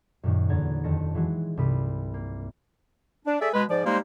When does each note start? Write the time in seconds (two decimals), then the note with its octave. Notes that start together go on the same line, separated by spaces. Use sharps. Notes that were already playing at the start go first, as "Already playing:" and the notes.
0.23 F#2 A#2 D#3
0.49 E2 D3 C#5 A#5 G#6 A6
0.84 D#1 F2 D#3 A5 A#6 C#7
1.14 E3 F#3 G#3 F#4
1.57 C2 G2 F4 B5 D#6 B6
2.14 A#3
3.26 D4
3.41 A3 G#4 A4 D5 E5
3.53 B2 G#3 B4
3.69 G#2 F3 D5
3.85 F3 G3 G#3 A#3 D#4 C5